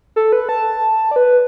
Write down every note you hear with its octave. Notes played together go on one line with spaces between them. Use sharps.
A4
B4
A5
D5
B4